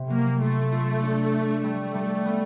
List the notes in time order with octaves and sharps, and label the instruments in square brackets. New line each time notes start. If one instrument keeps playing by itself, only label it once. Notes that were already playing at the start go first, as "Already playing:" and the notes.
Already playing: [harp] C3 B3
[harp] F#3 [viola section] A#3
[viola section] A3 [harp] F4
[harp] F4
D4
D4
[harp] G3 [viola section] A3
[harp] G3
B3